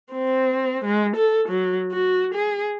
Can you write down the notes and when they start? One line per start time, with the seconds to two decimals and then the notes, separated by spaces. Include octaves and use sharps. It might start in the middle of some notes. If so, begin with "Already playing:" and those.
0.12 C4
0.85 G#3
1.16 A4
1.49 F#3
1.92 F#4
2.34 G#4